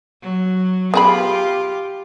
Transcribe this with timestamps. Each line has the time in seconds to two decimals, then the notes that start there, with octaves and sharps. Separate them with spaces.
0.22 F#3
0.94 B3 F4 G4 G#4 B5